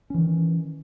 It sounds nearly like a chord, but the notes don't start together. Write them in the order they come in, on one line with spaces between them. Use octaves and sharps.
C#4 E3 D#3